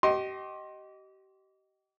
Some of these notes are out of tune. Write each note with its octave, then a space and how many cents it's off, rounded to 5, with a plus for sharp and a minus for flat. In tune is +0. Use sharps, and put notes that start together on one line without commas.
G4 -35 D#5 +0 C6 +25